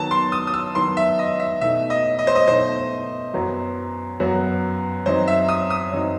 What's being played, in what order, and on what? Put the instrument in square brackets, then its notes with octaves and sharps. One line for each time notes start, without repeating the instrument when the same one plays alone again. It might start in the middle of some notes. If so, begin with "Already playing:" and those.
Already playing: [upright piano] D#3 F#3 B3 [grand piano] A5
[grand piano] C6
D#6
D#6
E6
[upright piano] D#3 F#3 B3 [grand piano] C6
[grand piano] E5
D#5
E5
[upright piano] B2 A3 D#4 [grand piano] E5
[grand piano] D#5
D#5
C5
D#5
[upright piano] B2 A3 D#4 [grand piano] C5
[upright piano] F#2 F#3 B3 F#4
F#2 F#3 B3 F#4
[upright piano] F#2 F#3 C4 D#4 [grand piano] C5
[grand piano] E5
D#6
D#6
[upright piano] F#2 F#3 C4 D#4